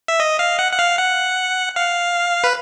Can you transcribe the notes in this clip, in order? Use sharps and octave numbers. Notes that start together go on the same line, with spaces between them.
E5
D#5
F5
F#5
F#5
F5
F#5
F5
B4